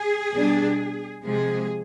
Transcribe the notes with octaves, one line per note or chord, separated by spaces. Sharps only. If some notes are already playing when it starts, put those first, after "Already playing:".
Already playing: G#4
B2 G3 D4
C3 F3 G#3 G#4